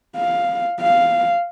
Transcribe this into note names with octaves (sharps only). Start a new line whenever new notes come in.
F5
F5